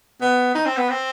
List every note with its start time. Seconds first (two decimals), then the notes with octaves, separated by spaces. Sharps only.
0.21 B3
0.55 D#4
0.66 C4
0.77 B3
0.89 C4